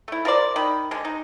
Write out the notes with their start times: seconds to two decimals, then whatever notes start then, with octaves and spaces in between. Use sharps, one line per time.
0.08 A3 E4
0.25 F4 A#4 C5 D5
0.56 D#3 B5
0.91 D3 G#3
1.05 D#4